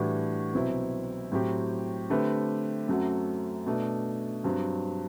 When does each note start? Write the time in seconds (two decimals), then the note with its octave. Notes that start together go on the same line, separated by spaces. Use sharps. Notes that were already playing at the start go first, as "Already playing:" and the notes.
Already playing: A2 E3 G3 D4 F#4
0.54 C2 B2 F#3 C4 E4
1.32 A2 F#3 C4 G4
2.10 D3 A3 C4 G4 B4
2.88 F#2 F#3 A3 C4 F#4
3.66 B2 A3 D4
4.44 G2 F#3 C4